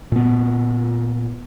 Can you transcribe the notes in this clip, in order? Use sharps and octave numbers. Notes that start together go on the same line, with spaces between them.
A#2 B3